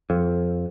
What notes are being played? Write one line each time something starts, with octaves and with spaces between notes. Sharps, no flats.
F2